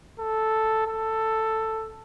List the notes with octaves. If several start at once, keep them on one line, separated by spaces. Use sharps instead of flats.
A4
A4